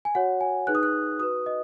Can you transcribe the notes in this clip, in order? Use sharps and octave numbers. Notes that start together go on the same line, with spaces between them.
G#5
F#4 C#5 F#5
G#5
D#4 G#4 B4 F#6
D#6
F#6
F#4 B4 D#6
D#5